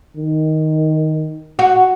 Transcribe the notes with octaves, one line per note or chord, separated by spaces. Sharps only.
D#3
F#4